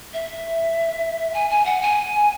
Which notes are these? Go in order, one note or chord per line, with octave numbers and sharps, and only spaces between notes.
E5
G#5
G#5
F#5
G#5